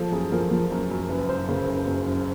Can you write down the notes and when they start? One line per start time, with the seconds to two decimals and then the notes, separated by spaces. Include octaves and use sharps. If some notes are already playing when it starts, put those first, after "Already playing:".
Already playing: F3 A4
0.12 F#2 G#4
0.31 F3 A#4
0.51 F3
0.71 F#2
0.90 F#2
1.09 F#1 B4
1.29 F#1 C5
1.48 C#3 A#4
1.68 F#1
1.87 F#2
2.07 F#1